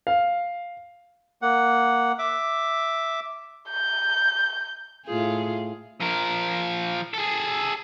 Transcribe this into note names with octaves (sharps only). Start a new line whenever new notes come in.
F5
A#3 F#5
E5 D6
G6
A2 F4 G#4
F3 A#4
G#4 A4